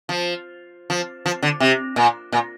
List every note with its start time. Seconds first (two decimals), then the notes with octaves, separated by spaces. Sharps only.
0.09 F3
0.90 F3
1.26 F3
1.42 D3
1.60 C3
1.96 A#2
2.32 A#2